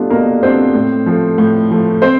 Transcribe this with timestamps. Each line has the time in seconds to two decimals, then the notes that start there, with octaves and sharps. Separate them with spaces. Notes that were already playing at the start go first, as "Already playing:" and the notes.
Already playing: B2 G3 A3 B3 D4 F4
0.10 B2 A#3 A#4
0.42 G3 B3 C4 D4 F4 C5
0.74 A2
1.06 F3 A3
1.38 A2
1.71 F3 A3
2.02 C4 C5